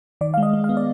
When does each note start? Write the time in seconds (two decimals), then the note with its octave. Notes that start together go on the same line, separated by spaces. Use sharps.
0.21 D#3 D5
0.34 G#3 F5
0.43 D#5
0.53 G#3
0.64 F5
0.69 B3
0.77 D5